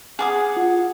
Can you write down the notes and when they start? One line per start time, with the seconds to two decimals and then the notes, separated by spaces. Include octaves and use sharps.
0.19 G#4 F#5 D6 D#6
0.57 F4